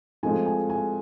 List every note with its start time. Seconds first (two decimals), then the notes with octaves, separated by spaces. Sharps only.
0.23 G#2 F3 A3 C4 D#4 G#5
0.46 G#5
0.70 G#5